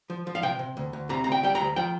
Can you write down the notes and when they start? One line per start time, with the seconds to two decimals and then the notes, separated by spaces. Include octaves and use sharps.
0.10 F3
0.27 F3
0.35 F5
0.43 C3 G5
0.59 C3
0.77 D2
0.93 D2
1.09 C3 A#5
1.24 D2 A#5
1.32 G5
1.43 G3 G5
1.55 A#5
1.60 D2
1.76 F3 G5